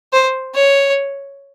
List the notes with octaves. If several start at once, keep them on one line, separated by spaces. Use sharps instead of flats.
C5
C#5